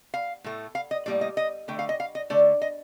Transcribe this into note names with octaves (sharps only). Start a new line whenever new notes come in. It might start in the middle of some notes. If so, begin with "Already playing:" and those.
F5
A2 A3
F5
D#5
A2 G3 A#3 D5
D#5
D#5
D3 A3 G5
F5
D#5
F5
D#5
D3 A3 D5
D#5